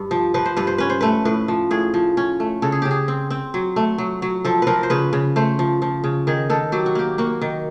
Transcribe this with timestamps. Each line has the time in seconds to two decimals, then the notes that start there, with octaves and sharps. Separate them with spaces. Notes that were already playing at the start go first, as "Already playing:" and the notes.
Already playing: G2
0.11 F3
0.34 F3 B4
0.45 C5
0.57 G2 B4
0.67 C5
0.78 C#4 B4
0.90 C5
1.01 A3 B4
1.25 A2 B4
1.48 F3
1.71 A2 G#4
1.94 F3
2.17 C#4
2.40 A3
2.62 C#3 A4
2.72 G#4
2.82 C#3 G4
2.91 G#4
3.08 C4
3.30 C4
3.54 F#3
3.76 A3
3.98 F#3
4.22 F#3
4.45 F3 A4
4.62 F3 A#4 B4
4.83 C5
4.90 C#3 B4
5.13 C#3
5.36 A3 C5
5.59 F3
5.82 F3
6.04 C#3
6.27 D#3 G#4
6.50 D#3 A4
6.72 F#3 G4
6.86 F#4
6.95 A#3 G4
7.18 A#3 F#4
7.42 D#3